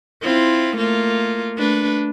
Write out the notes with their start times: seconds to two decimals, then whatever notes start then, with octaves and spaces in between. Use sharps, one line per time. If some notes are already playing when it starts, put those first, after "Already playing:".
0.22 C4 E4 F4
0.77 A3 A#3 F4
1.57 A3 D4 B4